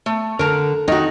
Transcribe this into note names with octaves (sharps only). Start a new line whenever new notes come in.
A3
D3 A#4 A#5
D#3 D#4 F#4